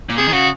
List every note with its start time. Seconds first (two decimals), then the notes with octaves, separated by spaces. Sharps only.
0.09 A#2
0.17 C3 G#4
0.28 D#3
0.33 C#3 F#4